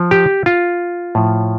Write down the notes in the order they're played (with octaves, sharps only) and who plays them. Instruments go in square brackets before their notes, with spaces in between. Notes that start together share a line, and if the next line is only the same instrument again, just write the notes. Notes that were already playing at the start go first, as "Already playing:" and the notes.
Already playing: [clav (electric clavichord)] F3
G4
F4
A2 F3